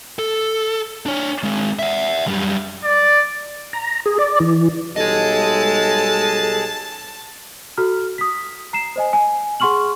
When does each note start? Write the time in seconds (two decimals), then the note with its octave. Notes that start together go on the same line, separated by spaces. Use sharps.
0.19 A4
1.06 D4 C#5
1.43 G#3 C4
1.79 E5 F#5
2.27 F#2 G3
2.84 D5
3.73 A#5
4.06 G#4
4.19 D5
4.40 E3
4.96 B1 G3 G#4 A4 D#5 A5
7.78 F#4 A4 A#5 F6
8.18 D#6 B6
8.73 A#5 C7 E7
8.96 C5 D#5 G#5
9.13 G#5
9.60 G#4 F#5 C6 C#6 F6 F#7